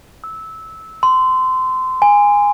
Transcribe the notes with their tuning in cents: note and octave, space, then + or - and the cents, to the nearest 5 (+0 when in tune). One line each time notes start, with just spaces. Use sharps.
E6 -15
C6 -25
G#5 -15